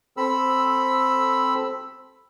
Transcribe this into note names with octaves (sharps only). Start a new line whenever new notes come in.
C4 A4 B5 E6